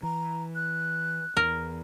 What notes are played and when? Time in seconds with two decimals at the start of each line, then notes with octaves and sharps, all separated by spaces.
0.03 E3 A#5
0.55 F#6
1.37 E2 A#4